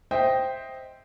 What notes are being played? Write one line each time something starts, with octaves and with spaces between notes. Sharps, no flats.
C5 D#5 E5 G5